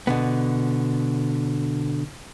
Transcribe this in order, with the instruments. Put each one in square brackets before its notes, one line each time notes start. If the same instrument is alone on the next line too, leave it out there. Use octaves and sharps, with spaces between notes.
[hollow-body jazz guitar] B2 D3 B3